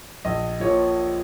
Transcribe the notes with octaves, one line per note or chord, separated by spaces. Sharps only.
A#1 D#5
A#2 F3 C#5